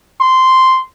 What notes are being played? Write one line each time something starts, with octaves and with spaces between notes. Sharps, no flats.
C6